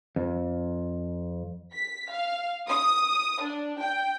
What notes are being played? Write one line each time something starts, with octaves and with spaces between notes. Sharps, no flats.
F2
B6
F5
D#6
D4
G5